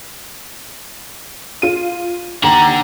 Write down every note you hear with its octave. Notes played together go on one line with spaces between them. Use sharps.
F4 D#7
D#2 D4 F#5 A#5